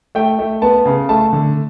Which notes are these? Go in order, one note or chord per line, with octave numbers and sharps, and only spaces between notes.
A3 G5
A3
B3 A5
C#3
A3 A5
D3